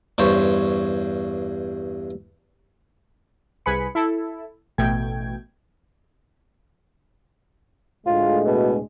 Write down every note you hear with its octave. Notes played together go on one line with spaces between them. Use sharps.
E2 G2 C5 C#5
C2 G#4 B4 G#5 B5 C#7
E4 A4
A1 B2 A3 G5 G#6
D2 A2 G#3 F4
B2